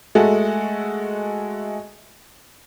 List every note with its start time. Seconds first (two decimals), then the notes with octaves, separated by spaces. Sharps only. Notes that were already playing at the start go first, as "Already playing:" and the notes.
0.15 G#3 A3 F#4 A4